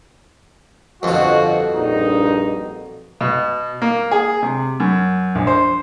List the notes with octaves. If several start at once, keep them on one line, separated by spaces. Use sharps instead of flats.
G1 F2 B2 F3 F#4
A#1 G2 D#4
B2
A#3
G#4
C3
F#2
A#1
C5